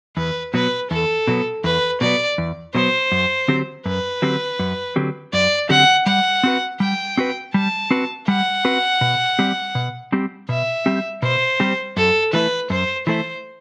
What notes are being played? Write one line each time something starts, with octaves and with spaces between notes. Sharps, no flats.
E2 B4
B2 F#3 B3 B4
E2 A4
B2 F#3 B3
E2 B4
B2 F#3 B3 D5
E2
B2 F#3 B3 C5
F#2
D3 F#3 C4 G4
F#2 B4
D3 F#3 C4 G4
F#2
D3 F#3 C4 G4
F#2 D5
D3 F#3 C4 G4 F#5
G3 F#5
C4 F#4 B4
G3 G5
C4 F#4 B4
G3 A5
C4 F#4 B4
G3 F#5
C4 F#4 B4
B2
G3 C4 G4
B2
G3 C4 G4
B2 E5
G3 C4 G4
B2 C5
G3 C4 G4
F#2 A4
E3 A3 E4 B4
F#2 C5
E3 A3 E4 C5